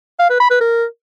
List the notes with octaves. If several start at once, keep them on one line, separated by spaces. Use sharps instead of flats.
F5
B4
B5
B4
A#4